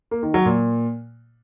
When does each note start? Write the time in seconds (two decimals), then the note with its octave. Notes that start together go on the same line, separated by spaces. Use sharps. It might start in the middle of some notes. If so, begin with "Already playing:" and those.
0.11 A#3
0.23 D#3
0.34 F#3
0.45 A#2